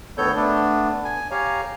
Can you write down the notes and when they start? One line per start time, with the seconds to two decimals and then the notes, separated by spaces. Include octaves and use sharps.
0.18 D2 D#3 B3 A4 C#5 G6
0.36 A3 B3 D4
1.04 G#5
1.31 G4 C#5 F5 G#5 A#5